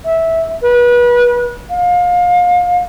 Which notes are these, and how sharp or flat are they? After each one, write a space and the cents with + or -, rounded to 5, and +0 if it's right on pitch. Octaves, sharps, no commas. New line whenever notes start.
E5 -10
B4 -30
F5 +30